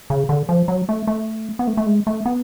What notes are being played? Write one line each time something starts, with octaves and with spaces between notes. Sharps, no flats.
C#3
D3
F3
F#3
A3
A3
B3
A3
A3
G#3
A3
B3